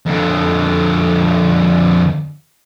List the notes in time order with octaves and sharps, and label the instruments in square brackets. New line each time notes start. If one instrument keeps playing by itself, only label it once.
[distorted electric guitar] F2 D3